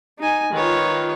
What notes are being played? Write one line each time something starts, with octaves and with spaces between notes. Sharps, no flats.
D#4 G#5
D#3 F4 B4 C#5